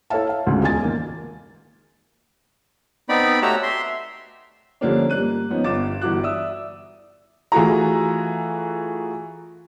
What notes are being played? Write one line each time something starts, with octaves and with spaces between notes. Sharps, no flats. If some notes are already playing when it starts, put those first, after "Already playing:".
E4 A4 C#5 E5 F5 A5
F5
D2 G#2 C#3
E1 G#3 F4 G#5 A6
D#3 A#3
B3 C4 D#4 D5 B5
A3 F#4 G4 C#5 A#5 E6
E5 C6
D3 F3 G3 A#3 C#4 D4
G2 A#3 F#6 D#7
F3 B3 C#4 D#4
G1 F4 D6 A6 E7
G1 E3 F#4 D6 F#6
D5 E5 D#6 E6
E3 A3 F4 F#4 G#4 A#5